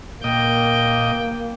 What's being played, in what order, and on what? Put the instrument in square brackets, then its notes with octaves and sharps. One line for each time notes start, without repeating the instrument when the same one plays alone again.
[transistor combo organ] A#2 D#5 [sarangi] A#3 [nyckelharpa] G5